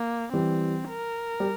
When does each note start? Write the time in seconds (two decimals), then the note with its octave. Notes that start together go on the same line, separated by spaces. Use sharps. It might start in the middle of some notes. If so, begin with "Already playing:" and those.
Already playing: A#3
0.33 E3 G3 C4
0.90 A#4
1.40 G3